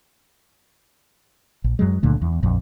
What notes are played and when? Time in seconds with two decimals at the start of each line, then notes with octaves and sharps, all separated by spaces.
1.64 A#1
1.79 F#2 F#3 G#3
2.03 C#2 A#2 D3 A3
2.22 E2
2.43 A#1 F2